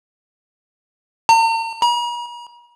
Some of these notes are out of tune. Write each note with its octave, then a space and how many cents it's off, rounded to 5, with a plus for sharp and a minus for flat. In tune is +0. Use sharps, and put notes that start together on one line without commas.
A#5 -45
A#5 +45